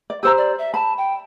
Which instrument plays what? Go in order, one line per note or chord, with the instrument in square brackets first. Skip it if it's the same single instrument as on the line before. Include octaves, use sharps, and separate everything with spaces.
[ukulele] D5
[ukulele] G4 C5 A#5 [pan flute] E6
[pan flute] D5
E5
[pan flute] A5 [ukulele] B5
[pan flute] G5